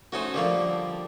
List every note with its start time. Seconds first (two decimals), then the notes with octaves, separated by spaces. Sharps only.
0.12 A3 C#4 D#4 F#4 C5
0.34 D3 F3 G3 A#3 A4